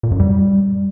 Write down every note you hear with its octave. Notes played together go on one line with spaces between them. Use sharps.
A#2
F#2
G3